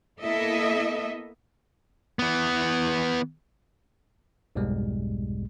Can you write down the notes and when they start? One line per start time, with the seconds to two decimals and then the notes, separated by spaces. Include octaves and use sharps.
0.20 A#3 B3 E4 A4 D#5 E5
2.19 E3 B3
4.56 B1 F2 G#2 B2 G3 G#3